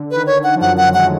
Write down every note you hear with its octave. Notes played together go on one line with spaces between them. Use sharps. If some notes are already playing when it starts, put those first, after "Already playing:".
Already playing: D3
D#3 B4
C#5
D3 F#5
F3
F#2 F#3 F#5
F#5
G#3 F#5
A3